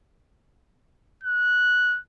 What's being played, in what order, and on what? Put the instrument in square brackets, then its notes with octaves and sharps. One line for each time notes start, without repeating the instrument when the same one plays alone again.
[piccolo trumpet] F#6